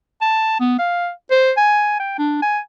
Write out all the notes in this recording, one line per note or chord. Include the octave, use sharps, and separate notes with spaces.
A5
B3
F5
C5
G#5
G5
D4
G#5